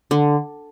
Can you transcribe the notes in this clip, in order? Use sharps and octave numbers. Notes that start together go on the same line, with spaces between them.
D3